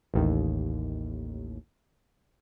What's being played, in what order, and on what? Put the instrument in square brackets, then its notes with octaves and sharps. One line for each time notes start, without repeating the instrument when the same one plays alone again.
[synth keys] A1 D#2